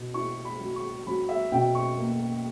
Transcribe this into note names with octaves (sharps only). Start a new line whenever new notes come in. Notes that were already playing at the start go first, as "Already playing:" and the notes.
Already playing: B2
E4 C#6
B5
F#3
C#6
F#3 B5
E5
B2 G5
C#6
A#3